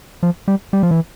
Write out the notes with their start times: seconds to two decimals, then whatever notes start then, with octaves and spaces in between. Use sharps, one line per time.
0.23 F3
0.48 G3
0.73 G3
0.83 F3
0.91 E3